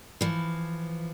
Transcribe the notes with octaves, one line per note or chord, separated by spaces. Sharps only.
E3 F3